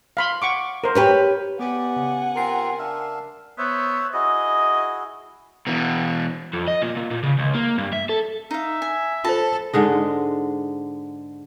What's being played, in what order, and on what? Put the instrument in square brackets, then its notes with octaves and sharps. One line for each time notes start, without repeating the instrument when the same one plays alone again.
[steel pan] F5 B5 C6
F#5 C#6 D6
A#4 C5
[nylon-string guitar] G4 B4 C#5
[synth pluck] B3 G4 B4 [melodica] D5 [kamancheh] F#5 G#5
[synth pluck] C#3
[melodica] C4 F4 A#5 [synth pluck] A#4 C7
[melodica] D4 E5 F5
[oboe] B3 [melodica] C5 C#5 E5
[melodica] E4 F#4 G#4 [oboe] D#5
[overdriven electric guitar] B2 E3
F2
D#5
A#2
A#2
A#2
C#3
C#2
A#3
G2
E5
A4
[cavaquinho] D#4 F5 [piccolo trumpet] E5
[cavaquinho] G#5
[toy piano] F4 C5 [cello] A4 [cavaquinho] A5
[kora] G#2 D3 G#3 D#5